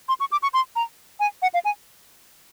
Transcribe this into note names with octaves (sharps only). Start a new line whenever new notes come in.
C6
C#6
D6
C#6
C6
A#5
G#5
F#5
F5
G#5